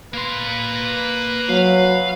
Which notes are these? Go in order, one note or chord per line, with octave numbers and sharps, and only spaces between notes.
A#3 B4 C6
F#3 F5